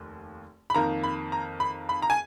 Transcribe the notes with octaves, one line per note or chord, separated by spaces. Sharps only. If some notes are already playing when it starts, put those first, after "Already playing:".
Already playing: F1 D#2
B5
F2 D#3 A#3 A#5
B5
A#5
B5
B5
A#5
G#5